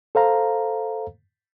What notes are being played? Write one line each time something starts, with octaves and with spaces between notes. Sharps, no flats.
A4 C5 F5 A#5